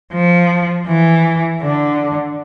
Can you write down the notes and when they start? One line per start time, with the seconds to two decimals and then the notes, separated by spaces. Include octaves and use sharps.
0.13 F3
0.87 E3
1.63 D3